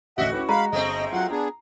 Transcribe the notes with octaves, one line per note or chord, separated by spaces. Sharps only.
A1 D2 F#4 D#5 E5 F#5
C#4 E4 G4 B4
G#3 F5 A#5 B5
G1 G#3 A3 C4 D#5
F#3 F4 F#5
B3 D4 G#4 A#5